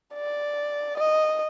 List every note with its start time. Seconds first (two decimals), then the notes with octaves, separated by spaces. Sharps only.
0.14 D5
0.98 D#5